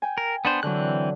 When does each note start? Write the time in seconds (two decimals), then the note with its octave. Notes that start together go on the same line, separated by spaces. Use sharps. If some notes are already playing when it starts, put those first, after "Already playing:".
0.02 G5 G#5
0.18 A#4
0.45 B3 D4 C5
0.63 D3 E3 F#3 C4 F#6